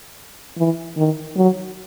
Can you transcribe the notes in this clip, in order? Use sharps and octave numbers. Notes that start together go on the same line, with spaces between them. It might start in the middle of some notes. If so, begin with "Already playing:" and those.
E3
D#3
F#3